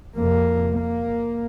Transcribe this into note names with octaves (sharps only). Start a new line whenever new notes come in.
F2 C3 A#3
A#3